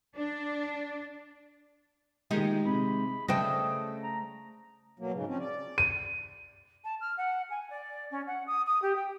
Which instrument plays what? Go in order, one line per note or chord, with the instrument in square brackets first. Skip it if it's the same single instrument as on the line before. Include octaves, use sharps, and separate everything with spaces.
[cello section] D4
[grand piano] A#2 D#3 [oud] G#3 D#4 G4
[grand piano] C3 [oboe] B5
[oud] C#3 D4 [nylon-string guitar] A3 C5 G5 [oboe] D#5 [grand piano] A5 A#6
[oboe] A#5
[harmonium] B2 F#3 A#3
G#2 C#3
F3 C4 C#4
D5
[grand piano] D#7
[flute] A5
F6
F#5
G#5
D5
C#4
F#5
D#6
D#6
G4
G5